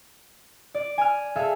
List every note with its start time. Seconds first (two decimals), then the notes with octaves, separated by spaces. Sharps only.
0.75 D5
0.98 G#5 F6
1.36 G#4 A4 E5 F5